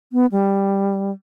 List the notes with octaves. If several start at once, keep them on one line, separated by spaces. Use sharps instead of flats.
B3
G3